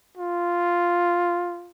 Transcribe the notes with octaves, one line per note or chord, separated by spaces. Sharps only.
F4